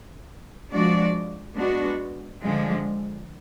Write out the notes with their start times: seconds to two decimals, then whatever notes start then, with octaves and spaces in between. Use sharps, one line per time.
0.72 F3 G#3 D4 F#4 D5
1.56 G#3 B3 D4 F#4
2.42 D3 F3 G#3